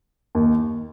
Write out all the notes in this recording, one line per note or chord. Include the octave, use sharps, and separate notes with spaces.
D#2